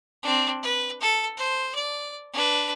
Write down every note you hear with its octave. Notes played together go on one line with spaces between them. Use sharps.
C4 D4
B4
A4
C5
D5
D4 B4